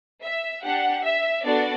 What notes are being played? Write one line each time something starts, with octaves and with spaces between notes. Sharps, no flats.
E5
D4 G4 F#5
E5
B3 D4 F#4 A4 D5